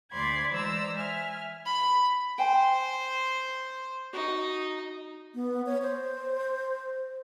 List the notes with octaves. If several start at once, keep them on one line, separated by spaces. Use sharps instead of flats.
D2 C5 D5 B5 C6 G#6
E3 G#3 C5 D5 A#5 E6
E5 G#5 F6
B5
C5 G5 G#5
D#4 F#4
B3
C#5
C5